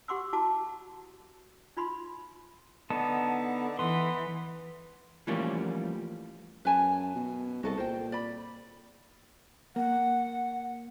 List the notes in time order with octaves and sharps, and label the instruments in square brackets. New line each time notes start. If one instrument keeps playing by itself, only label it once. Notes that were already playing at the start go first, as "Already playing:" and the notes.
[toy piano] G4 F#5 C6 D6 E6
E4 F#4 A5 D6 D#6
D#4 F4 B5 C6
[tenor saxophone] D3 [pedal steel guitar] B3 D#4 A5
[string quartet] E3 [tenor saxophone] B3 [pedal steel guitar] C6
[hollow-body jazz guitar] E3 F3 G3 A3 A#3 C#4
[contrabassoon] F#2 [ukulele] B4 G#5 A5
[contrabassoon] B2
[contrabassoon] C2 [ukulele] F#4 A4 D#5
[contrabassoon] A#2 [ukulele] C5 G5
[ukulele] D5 B5
[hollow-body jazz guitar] A#3 [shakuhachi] F#5